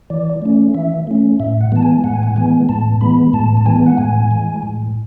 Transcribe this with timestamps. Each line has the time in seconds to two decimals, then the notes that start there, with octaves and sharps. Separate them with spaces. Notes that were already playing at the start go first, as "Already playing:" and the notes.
0.10 E3 D5
0.42 A3 C#4
0.74 E3 E5
1.07 A3 C#4
1.40 A2 E5
1.61 F#5
1.72 E3 G#3 B3 A5
1.82 G#5
2.04 A2 F#5
2.13 G#5
2.23 F#5
2.36 E3 G#3 B3 G#5
2.69 A2 A5
3.01 E3 G#3 B3 B5
3.33 A2 A5
3.57 A5
3.66 E3 G#3 B3 G#5
3.86 F#5
3.98 A2 G#5
4.31 E3 G#3
4.63 A2